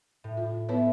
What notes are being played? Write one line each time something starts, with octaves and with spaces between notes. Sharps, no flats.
A2
F4
B3 E4 B4 C#5